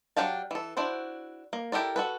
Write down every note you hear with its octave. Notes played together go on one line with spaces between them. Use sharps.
F#3 D4 G4 F5 A5
E3 A4
D4 E4 F#4 C5
A#3
E4 G4 A4 A#4 D5
F#4 A4 B4